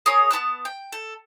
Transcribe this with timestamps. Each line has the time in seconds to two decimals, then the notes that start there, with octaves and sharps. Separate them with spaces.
0.06 G#4 A#4 C#5 D#6
0.31 B3 F#4 A5 F#6
0.65 G5
0.92 A4